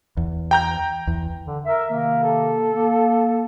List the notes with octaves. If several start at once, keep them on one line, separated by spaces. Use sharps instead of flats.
E2
G5 A#5 G6
E2
D3
A#4 E5
C3 D#3 A#3 A#4
A4
A#3